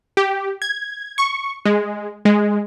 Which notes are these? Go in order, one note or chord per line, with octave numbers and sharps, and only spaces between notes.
G4
G#6
C#6
G#3
G#3